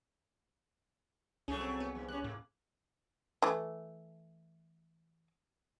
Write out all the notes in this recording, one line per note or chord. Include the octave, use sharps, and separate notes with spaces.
C2 F#3 A3 C#4 G#4
C4
B3
G#2 F3
G3 A3 C#4 F#6
A2 A#3
E3 A3